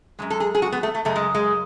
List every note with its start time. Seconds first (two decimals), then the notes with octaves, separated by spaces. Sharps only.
0.19 F#2 C#3 G#3
0.30 A4
0.40 G#4
0.55 G#4
0.62 F#4
0.72 B3
0.83 A3
0.95 A3
1.05 F#2 C#3 G#3 A3
1.16 G#3
1.35 G#3